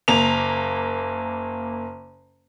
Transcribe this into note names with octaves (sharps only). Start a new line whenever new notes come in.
F#1 A#3 F7